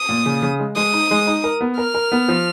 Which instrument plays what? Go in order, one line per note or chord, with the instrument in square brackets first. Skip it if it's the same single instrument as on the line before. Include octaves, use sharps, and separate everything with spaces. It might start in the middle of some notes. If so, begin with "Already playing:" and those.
Already playing: [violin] D#6
[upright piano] A#2
C#3
C#3
G#3
[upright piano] G#3 [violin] D#6
[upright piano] D#4
G#3
D#4
A#4
B3
[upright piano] A#4 [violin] F6
[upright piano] A#4
B3
F3